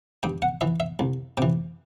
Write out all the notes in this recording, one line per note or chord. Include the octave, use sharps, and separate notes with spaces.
G2 G5
F#5
E3 E5
E5
C2
C3 E3 G5